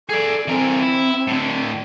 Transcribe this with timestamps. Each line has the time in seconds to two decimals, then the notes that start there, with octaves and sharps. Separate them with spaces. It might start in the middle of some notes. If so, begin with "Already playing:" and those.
0.09 G#4 A4 D5
0.48 E3 C4 A#4
0.81 E4
1.27 A2 D3